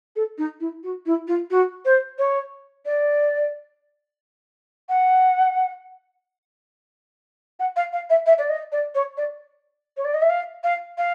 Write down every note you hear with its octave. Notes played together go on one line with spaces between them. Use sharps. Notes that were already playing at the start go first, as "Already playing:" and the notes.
A4
D#4
E4
F#4
E4
F4
F#4
C5
C#5
D5
F#5
F#5
F5
F5
E5
E5
D5
D#5
D5
C#5
D5
C#5
D5
D#5
E5
F5
F5
F5